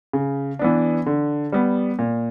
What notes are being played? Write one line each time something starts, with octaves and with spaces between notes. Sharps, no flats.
C#3
E3 B3 D4
D3
G3 B3
A#2